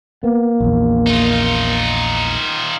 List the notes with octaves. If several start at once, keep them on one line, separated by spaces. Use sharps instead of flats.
A#3 B3
A#1 E2
D#4 F4